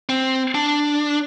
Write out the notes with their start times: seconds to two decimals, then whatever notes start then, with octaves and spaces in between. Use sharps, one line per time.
0.09 C4
0.55 D4